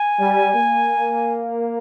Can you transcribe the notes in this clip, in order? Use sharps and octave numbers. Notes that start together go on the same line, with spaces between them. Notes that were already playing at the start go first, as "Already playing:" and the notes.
Already playing: G#5
G3
A#3